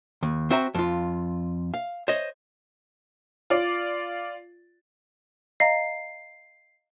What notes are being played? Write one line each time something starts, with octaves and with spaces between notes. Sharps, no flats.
D#2
C4 F#4 C5 E5 F5 A#5
F2 F4
F5
C5 C#5 D#5
F4 D5
D#5 F5 A#5 C7